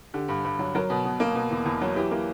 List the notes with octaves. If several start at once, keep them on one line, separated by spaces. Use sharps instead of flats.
D3 G4
G2
G2
F#3
F#3 A#4
B2
B2
A#3
B2
E2
E2
F#3
E3 G4
A#3